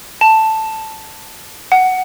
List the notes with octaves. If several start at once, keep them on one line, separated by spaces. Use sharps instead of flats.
A5
F#5